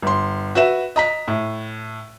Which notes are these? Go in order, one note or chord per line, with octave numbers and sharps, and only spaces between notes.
G1 C6
F#4 B4 E5 E7
D#5 A#5 B6
A2